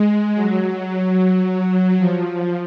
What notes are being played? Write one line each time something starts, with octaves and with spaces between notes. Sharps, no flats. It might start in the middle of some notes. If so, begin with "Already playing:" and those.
Already playing: G#3
F#3
F#3
F3